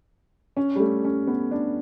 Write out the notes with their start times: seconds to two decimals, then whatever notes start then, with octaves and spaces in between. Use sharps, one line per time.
0.57 C#4
0.76 G3
0.80 A3
1.04 C#4
1.27 B3
1.51 D4